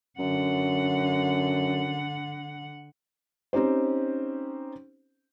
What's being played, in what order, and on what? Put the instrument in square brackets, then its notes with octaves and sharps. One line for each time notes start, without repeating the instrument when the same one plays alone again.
[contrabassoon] F#2 [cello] D3 F#5
[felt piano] C4 C#4 D#4 G4 C5